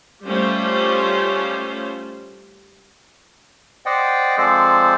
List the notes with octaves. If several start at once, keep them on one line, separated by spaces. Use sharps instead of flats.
G3 A3 C#4 F4 C5
C5 D5 D#5 F#5 G5
F3 G#3 C4 A4 C5 D5